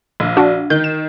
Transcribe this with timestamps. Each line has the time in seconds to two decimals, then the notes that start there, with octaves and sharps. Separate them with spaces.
0.20 A#1
0.37 D4 F#4
0.70 D#3 G6
0.84 E7